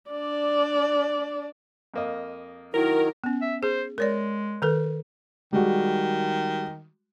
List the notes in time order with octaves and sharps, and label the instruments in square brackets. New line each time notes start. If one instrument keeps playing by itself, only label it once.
[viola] D4 D5
[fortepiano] F2 A#3 D#5
[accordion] D#3 F#3 [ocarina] E4 [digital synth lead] A#4
[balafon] B3 C#4
[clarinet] E5
[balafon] G#4 [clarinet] C5
[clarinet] G#3 [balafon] A#4 C#5 D5
[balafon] D#3 A4 B4
[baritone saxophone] D#3 [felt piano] G3 G#3 F#4